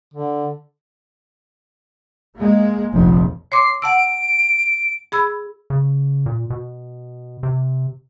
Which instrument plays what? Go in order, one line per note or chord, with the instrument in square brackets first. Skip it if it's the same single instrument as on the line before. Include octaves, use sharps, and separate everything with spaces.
[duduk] D3
[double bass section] G#3 A#3
F1 A#1 F3
[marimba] C#5 C6 D6 [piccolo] C7
[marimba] F#5 A5 E6 [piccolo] D7
[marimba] G#4 B5 E6
[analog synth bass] C#3
A#2
B2
C3